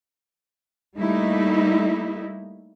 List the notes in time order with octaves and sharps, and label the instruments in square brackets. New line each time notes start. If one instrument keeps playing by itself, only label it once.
[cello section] G3 A3 A#3 D#4 E4